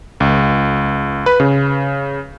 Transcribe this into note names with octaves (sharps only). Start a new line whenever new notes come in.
C#2
B4
C#3